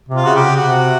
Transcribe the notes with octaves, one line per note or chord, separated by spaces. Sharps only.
C3
F4
C#3 F#4
G4
C3 F#4